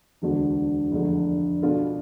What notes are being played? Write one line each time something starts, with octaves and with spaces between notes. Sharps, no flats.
E1 D2 D3
F1 E2 D3 A3
B2 B3 D4 F4 A4